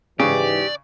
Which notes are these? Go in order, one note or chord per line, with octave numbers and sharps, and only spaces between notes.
G#2 C#3 E3 G4 D5